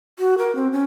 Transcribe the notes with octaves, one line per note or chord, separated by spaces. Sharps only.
F#4
A#4
C4
C#4